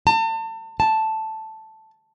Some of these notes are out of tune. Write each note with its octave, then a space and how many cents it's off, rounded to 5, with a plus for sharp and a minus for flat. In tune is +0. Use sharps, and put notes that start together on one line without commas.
A5 +35
A5 +0